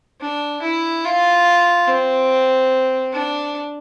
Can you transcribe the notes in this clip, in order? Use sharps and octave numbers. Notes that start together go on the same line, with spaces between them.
D4
E4
F4
C4
D4